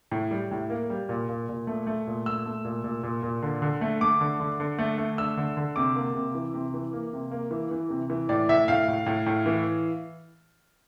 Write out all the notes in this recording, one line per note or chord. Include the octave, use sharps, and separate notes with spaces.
A2
G3
A2
A#3
G3
A#2
A#2
A#2
A3
A3
A#2
A3 E6
A3
A#2
A#2
A#2
A#2
D3
D3
A3
A3 D6
D3
D3
D3
A3
A3
D3 E6
D3
D3
C3 D6
A#3
C3
E3
C3
E3
A#3
C3
A#3
E3
E3
C3
E3
A2 D5
A2 E5
A2 F5
A2
A2
A2
E3